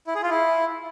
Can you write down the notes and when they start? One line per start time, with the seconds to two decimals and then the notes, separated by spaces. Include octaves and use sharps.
0.07 E4
0.15 G#4
0.23 F4
0.31 E4